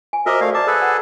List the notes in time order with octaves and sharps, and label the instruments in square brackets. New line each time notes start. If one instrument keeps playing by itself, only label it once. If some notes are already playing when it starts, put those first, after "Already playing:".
[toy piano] G#5
[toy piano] F#4 C5 D6 [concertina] A#4 D#5 E5
[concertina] A3 F5 [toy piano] A#4 D5
[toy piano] D5 A#5 D6 [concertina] A5
[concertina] G#4 A4 B4
[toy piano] F#5